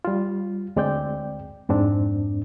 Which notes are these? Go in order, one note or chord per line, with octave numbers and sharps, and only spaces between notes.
G3 F4
D2 G#3 C4 D5 G5 G6
F2 G#2 C4 D4